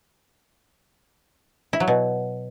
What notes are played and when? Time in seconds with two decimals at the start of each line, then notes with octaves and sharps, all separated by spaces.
1.73 E4
1.80 F#3
1.88 B2